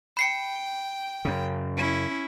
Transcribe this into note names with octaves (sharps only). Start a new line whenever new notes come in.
G5 B5 C7 C#7
F#2 C#3
C#4 E4